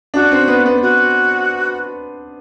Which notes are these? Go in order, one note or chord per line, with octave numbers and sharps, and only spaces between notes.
D4 F#4
C4
B3
B3
F#4